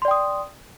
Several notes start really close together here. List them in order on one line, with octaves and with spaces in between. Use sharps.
C6 D5 G5 D#6